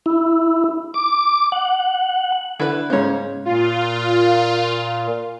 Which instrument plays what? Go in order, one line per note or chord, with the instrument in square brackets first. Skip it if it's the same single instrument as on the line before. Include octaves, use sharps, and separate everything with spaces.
[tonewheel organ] E4
D6
F#5
[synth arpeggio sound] D3 [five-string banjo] E4 B4
[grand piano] G#2 C#3 [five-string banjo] C5 C#5
[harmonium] A#2 [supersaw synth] F4